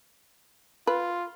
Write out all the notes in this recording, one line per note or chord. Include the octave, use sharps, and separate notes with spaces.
F4 B4